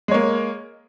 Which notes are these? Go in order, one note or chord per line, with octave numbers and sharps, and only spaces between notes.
G#3 A#3 C#5